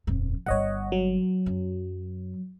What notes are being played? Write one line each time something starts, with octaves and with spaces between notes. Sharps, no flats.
D#1 F2
G1 G3 C#5 D#5 F#5
F#3
F#2